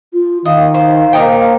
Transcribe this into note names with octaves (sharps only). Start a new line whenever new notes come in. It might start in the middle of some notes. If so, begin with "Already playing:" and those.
F4
D#3 D#5 F5
C5
A#2 A#3 D#4 A#4 C5 G5